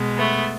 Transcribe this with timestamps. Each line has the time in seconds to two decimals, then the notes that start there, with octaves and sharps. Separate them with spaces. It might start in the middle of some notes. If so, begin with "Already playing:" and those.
Already playing: B2 G#3
0.18 A3 B3